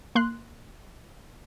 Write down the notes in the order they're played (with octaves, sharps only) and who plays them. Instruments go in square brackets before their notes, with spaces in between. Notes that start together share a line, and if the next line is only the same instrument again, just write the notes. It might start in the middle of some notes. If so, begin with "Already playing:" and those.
[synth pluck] A#3 C6 F#6